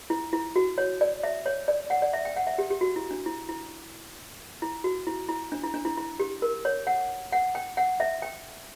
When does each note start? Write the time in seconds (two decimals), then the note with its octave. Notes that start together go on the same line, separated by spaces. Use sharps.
0.10 E4
0.33 E4
0.56 F#4
0.78 C#5
1.01 D5
1.23 E5
1.46 C#5
1.68 D5
1.90 F#5
2.02 D5
2.13 E5
2.25 G5
2.36 F#5
2.47 E5
2.58 G4
2.70 G4
2.81 F#4
2.96 E4
3.11 D4
3.26 E4
3.49 E4
4.62 E4
4.84 F#4
5.07 E4
5.29 E4
5.52 D4
5.63 E4
5.74 D4
5.85 E4
5.98 E4
6.20 G4
6.42 A#4
6.65 C#5
6.87 F#5
7.32 F#5
7.55 G5
7.77 F#5
8.00 E5
8.22 G5